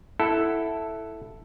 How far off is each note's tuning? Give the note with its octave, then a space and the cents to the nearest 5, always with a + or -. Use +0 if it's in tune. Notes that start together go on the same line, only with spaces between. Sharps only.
E4 +0 A4 +0 F#5 +10